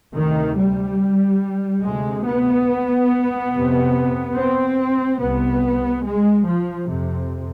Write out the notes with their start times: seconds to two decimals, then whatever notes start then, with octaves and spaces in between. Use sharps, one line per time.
0.16 D2 C3 D#3
0.58 G3
1.83 D2 C3 G#3
2.26 B3
3.51 F2 C3
4.35 C4
5.19 C2 C3 B3
6.03 G#3
6.45 F3
6.87 F2 C3